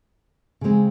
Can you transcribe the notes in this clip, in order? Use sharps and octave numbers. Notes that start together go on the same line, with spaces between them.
C#3 G#3 C4